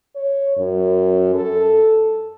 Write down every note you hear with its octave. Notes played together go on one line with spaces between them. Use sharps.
C#5
F#2
A4